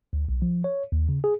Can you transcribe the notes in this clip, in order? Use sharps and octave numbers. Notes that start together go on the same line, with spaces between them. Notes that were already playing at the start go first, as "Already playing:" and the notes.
D2
B1
F3
C#5
D#2
C#3
G#4